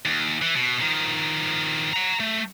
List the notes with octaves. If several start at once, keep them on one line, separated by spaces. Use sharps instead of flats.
D#2
E3
B2
D#3 F3
F#5 A#5
A3